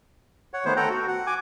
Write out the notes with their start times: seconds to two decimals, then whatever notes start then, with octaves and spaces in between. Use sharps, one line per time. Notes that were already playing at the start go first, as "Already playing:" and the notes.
0.53 C#5 F#5
0.65 D#3 A3 B3 C5
0.77 A4 F#5 G5 A#5
0.90 F#4
1.08 F#5
1.27 G#5 D6